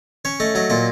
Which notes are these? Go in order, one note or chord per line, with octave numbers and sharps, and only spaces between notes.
C#4 C#5
A3 D#5
F#3 D#5
A#2 D#5